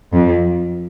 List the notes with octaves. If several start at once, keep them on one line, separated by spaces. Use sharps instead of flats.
F2